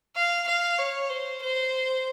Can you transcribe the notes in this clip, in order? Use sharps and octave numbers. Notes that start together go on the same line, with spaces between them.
F5
F5
C#5
C5
C5